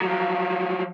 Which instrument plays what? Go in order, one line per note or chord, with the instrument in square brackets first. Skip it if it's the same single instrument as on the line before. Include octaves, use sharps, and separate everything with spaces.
[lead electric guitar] F3 F#3